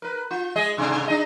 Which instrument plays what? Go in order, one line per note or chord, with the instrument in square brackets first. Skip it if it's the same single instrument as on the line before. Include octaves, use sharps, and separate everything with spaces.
[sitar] A#4 B4
F4
G#3 G#4 D#5
G#2 C3 D4
D4 D#5